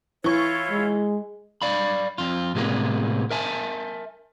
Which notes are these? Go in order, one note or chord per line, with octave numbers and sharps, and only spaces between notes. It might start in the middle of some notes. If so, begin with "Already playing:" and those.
E3 E4 F4 C#5 C#6
G#3
D5 F5 B5
F2 F4
A2 C3 G#3 A#3 B3
A#4 E5 G#5 A5